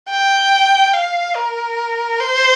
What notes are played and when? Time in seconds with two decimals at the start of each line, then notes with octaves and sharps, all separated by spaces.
0.10 G5
0.94 F5
1.36 A#4
2.20 C5